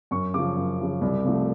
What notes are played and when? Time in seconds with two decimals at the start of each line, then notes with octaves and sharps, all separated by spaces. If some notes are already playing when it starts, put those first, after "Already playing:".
0.11 F#2 C#6
0.34 C#3 F3 D6
0.56 F#2
0.80 C#3 F3
1.01 C2
1.24 C3 F3 A3